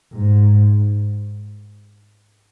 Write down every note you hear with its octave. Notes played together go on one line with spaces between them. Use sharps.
G#2